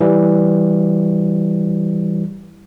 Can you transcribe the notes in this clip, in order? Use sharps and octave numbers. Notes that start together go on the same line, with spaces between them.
E3 G3